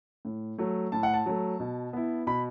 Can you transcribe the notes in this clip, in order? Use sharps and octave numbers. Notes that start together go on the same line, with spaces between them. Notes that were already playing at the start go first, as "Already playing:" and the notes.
A2
F#3 A3
A2 A5
F#5
A5
F#3 A3
B2
B3 E4
B2 B5